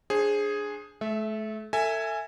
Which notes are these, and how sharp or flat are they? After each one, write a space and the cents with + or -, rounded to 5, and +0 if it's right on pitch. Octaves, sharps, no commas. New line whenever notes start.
D4 +0 G#4 +0 C5 +30
A3 -35 E5 +0
A4 +30 E5 +0 G#5 +0